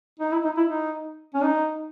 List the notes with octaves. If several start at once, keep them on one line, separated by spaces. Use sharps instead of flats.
D#4
E4
D#4
E4
D#4
C#4
D#4